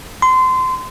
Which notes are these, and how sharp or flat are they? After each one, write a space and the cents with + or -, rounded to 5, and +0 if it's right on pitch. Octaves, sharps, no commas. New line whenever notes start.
C6 -25